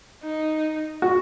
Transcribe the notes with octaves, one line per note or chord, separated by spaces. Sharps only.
D#4
F#4